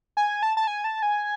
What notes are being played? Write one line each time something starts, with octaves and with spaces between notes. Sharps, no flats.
G#5
A5
A5
G#5
A5
G#5